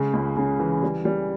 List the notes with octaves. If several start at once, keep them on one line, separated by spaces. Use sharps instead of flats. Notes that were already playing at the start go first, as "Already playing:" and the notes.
Already playing: C#3 G#3
C#2
C#3
E3
G3
G3